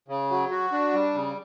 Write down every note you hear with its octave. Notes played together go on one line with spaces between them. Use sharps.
C#3
F#3
F#4
D4
G3
C#3